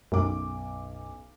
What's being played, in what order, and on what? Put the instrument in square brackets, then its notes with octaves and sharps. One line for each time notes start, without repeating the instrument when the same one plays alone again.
[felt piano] B1 D6 [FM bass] F#2